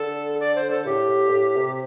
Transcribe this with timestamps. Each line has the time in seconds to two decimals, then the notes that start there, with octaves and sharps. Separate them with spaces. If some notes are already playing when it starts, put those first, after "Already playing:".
Already playing: D3 A4
0.40 D5
0.55 C5
0.70 A4
0.86 A2 G4
1.09 A2
1.28 G2
1.32 A2
1.56 C3